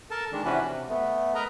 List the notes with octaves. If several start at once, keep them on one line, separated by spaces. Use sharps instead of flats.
A4 A#4 A5
D#3 G#3 D4
C3 E3 C#4 D4 F#4 B4
C3
A3 B3
A#4 B4 D#5 A#5